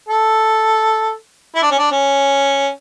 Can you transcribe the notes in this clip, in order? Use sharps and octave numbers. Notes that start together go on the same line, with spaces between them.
A4
E4
D4
C#4
D4
C#4